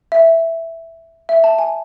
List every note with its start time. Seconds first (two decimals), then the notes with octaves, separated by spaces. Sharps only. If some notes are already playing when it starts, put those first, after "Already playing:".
0.12 E5
1.29 E5
1.44 A5
1.59 G#5